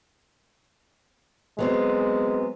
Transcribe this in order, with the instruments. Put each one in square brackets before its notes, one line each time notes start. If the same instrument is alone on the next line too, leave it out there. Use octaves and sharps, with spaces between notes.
[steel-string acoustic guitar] F#3 B3 C4 [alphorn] G#3